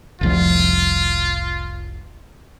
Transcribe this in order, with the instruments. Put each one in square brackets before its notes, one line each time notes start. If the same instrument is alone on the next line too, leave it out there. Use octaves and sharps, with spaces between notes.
[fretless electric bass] F1 C2 F3 [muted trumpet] F4